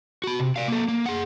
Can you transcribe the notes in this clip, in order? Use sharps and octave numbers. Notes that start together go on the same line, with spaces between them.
F#4 B5
C3
D5 F5
A#3 A4
A#3
G#4 F#5